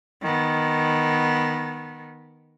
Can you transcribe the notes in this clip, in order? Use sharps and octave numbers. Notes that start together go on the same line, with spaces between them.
D#3 B3